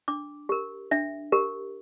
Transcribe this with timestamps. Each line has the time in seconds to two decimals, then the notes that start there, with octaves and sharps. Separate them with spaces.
0.08 D4 D6
0.49 G4 A#4
0.91 D4 E5
1.32 G4 A#4